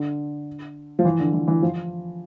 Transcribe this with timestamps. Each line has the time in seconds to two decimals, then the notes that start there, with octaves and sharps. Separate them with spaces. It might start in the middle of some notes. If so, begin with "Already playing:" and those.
Already playing: D3
0.99 F3
1.05 E3
1.19 D3
1.33 E3
1.48 E3
1.62 F3